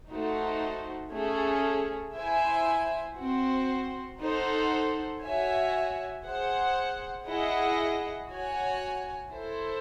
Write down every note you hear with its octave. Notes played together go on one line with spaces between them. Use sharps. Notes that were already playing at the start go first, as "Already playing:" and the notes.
A3 D#4 F#4 C5
A3 C#4 G#4
E4 C5 E5 G#5
C4 F#4 C5
D#4 A4 C5 F#5
F#4 C#5 E5 G#5
G#4 C5 F#5
E4 G#4 D#5 F#5
F#4 C#5 G#5
E4 A4 C5